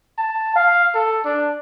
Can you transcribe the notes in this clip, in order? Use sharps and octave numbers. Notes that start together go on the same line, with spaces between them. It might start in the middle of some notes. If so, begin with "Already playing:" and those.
A5
F5
A4
D4